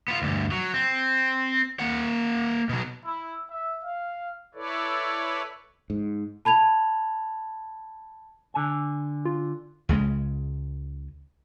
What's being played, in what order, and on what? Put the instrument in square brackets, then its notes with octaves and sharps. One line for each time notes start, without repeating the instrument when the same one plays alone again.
[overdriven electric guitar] B3 F4
D2 G2
F#3
C4
A#3 F#5
B2 F#3
[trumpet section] E4
E5
F5
[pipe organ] E4 A4 B4 C#5 D5
[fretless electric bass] G#2
[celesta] A5 B5 G#6 F7
[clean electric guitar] D3 G#5
[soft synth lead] F4
[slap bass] C#2 C#3 F#3 G#3